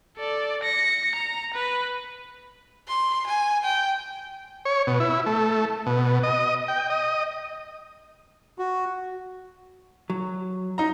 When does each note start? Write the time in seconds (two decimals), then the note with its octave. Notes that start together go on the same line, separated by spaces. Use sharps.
0.18 A4 D5
0.63 A#6 C#7
1.16 A#5
1.54 B4
2.88 C6
3.27 G#5
3.64 G5
4.65 C#5
4.87 B2
5.00 E4
5.26 A3
5.86 B2
6.23 D#5
6.68 G5
6.90 D#5
8.59 F#4
10.10 F#3
10.78 D#4 A#5